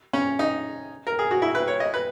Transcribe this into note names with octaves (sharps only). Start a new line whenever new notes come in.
C#4
D#4
A#4
G#4
F#4
E4
B4
C#5
D#5
B4